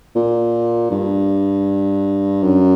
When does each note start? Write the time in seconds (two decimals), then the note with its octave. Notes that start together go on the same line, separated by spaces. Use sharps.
0.15 A#2
0.91 G2
2.43 F#2